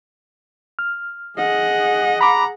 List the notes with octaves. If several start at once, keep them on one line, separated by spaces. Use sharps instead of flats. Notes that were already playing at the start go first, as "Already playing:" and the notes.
F6
G#4 D#5 F#5
A#5 B5 D6